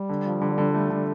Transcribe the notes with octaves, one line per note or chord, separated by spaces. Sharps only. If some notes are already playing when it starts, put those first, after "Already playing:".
Already playing: G3
D3
F3
D3
D3
A3
D3